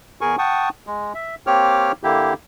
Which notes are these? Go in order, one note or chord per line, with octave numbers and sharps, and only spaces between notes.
E2 G#4 A#4 G#5 C#6
F#5 G5 A5 C#6 D#6
G#3
E5
A#3 C4 G4 C#5 D6 F6
D3 A#3 E4 G4